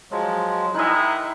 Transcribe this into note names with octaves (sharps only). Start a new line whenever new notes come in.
F3 F#3 G#3
D#3 E3 G#3 D#4 E4 E5 F#6